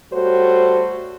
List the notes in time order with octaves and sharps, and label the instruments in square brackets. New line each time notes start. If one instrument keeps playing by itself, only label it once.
[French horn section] G3 A3 F#4 C5 C#5